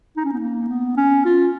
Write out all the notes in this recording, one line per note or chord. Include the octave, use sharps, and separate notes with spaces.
D#4
C#4
B3
A#3
B3
C#4
F4